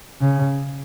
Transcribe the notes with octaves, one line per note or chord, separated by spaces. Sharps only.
C#3